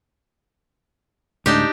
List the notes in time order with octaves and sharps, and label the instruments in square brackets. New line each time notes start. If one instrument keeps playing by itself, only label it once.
[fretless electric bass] D2 A2 G#3 [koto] D4 D#4 G4